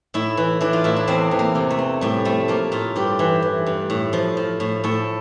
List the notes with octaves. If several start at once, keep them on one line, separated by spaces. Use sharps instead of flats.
A2 E4
E3
E3 D4
F4
A2 E4
D4
E2 C4
E2
A#3
C3
A3
E3
A2 G3
F3 A3
F3 A#3
A2 F4
G2 G4
E3
E3
G2
A2
F3
F3
A2
A2 A4